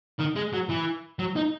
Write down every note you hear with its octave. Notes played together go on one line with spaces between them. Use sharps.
D#3
G#3
F#3
E3
F#3
D#4